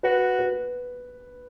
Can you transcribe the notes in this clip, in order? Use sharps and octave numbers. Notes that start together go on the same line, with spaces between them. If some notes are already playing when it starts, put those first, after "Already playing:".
F#4 B4
B4